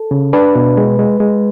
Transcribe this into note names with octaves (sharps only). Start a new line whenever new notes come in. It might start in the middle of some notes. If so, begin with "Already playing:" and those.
Already playing: A4
C#3
D4 B4
B2
G#3
G#3
G#3